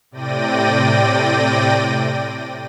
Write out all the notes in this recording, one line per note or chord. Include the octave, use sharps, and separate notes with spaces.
A2 C3 D5 G5 A#6 D#7